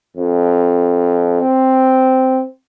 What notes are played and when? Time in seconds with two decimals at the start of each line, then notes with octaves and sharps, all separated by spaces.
0.17 F2
1.41 C4